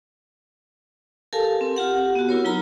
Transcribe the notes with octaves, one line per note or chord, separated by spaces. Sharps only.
G4 A4 A#4 F5 G#5 A5
C4
F4 G4 F#5
B3 F#4
E4 A#4 C#5
F#3 D#4 F4 A#5 B5